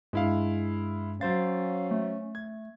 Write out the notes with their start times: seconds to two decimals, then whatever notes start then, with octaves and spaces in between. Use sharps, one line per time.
0.13 G2 G#3 E4 F5
1.21 F#3 C#4 C5 F5 A6
1.91 A3
2.35 G#6